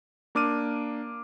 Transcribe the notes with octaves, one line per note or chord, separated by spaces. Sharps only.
A#3 D4 D6 F6 D#7